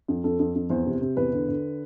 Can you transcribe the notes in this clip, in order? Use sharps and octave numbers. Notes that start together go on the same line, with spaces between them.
F2
F2 A4
F2
F2
E2 C5
C3
C3
E2 B4
D3
D3